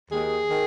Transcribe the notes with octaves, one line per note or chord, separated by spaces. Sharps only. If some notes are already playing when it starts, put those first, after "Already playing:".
D#2 D#3 G#4
D#3